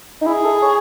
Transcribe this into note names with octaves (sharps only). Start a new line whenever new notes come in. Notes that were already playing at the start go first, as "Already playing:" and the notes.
D#4
E4 G#4
A4
C#5